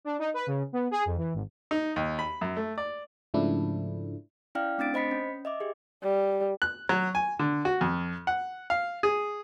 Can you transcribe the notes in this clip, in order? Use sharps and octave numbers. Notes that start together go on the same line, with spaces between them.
D4
D#4
B4
C#3
B3
G#4
F2
E3
G#1
D#4
D#2
B5
F#2
A3
D5
G#2 C#3 F3 A3 D4 E4
C#4 E4 D5 F5 G5 F6
A3 C4 D4 A6 D7
C5 D#5 B5 B6 C#7
C#4
D#5 E5 D6
G4 G#4
G3
F#6
F#3
G#5
D3
F#4
F2
F#5
F5
G#4